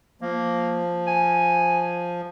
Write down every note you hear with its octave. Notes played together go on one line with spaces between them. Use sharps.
F3 A#3
G#5